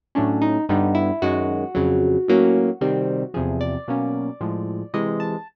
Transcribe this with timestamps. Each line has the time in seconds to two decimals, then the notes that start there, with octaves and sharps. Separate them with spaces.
0.15 A2 F#3 A3 C#4 D4
0.42 D#4
0.69 G2 D3 G3 B3 D#4
0.95 E4
1.22 F#2 D#3 G#3 F#4
1.75 F2 C#3 F#3
2.28 A2 F#3 A#3 C#4
2.81 C3 D#3 G3 C4
3.34 E2 C3 F3 G#4
3.61 D5
3.88 B2 F#3 A#3 C#4
4.41 A2 F3 G#3
4.94 C3 E3 G#3 D#5
5.20 A5